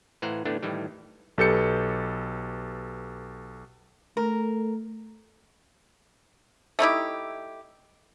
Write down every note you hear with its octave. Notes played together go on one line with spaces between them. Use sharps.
A2 E3 C5 F5 F#5 A#5
A2 D3 E3 A3 B3 D4
A2 D#3 E3 G3
B1 G4 A4 B4 G6 C#7
A3 A#4
A3 D#4 E4 G4